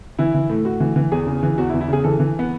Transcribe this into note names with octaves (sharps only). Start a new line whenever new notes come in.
E3 E4
E3
A2
A2 F#4
E3
E3
E2 G#4
C#3
E3
E2 F#4
E4
E2
E4
C#3 G#4
E3 A4
E3
B3